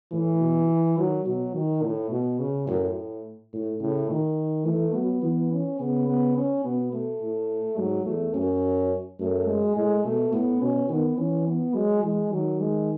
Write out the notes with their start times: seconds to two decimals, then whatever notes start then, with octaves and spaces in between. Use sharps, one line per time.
0.12 A2 E3
0.40 B2
0.97 D#3 F#3
1.25 B2 F#3
1.54 D#3
1.83 A2
2.11 B2
2.39 C#3
2.67 F#2 A2
3.53 A2
3.80 A2 C#3
4.09 D#3
4.66 E3 A3
4.94 F#3 B3
5.23 E3 B3
5.51 C#4
5.79 C#3 B3
6.08 B3
6.36 C#4
6.64 B2 B3
6.93 A3
7.21 A2
7.78 G#2 F#3
8.06 E2 A3
8.34 F#2 C#4
9.20 F#2 A3
9.47 G#3
9.76 A2 G#3
10.04 B2 A3
10.33 A2 B3
10.61 B2 C#4
10.89 D#3 B3
11.18 E3 C#4
11.46 B3
11.74 F#3 G#3
12.03 E3 G#3
12.31 D#3 F#3
12.59 G#3